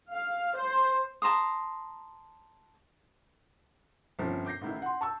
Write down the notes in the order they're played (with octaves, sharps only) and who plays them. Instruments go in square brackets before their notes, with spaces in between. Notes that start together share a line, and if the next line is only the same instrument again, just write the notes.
[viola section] F5
C5
[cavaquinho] A5 A#5 C6 D#6
[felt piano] G1 F3 C4 C#4
D6 G6 A#6 C7
A1 A2 D#3 E4
F#5 C6
A5 C#6 E6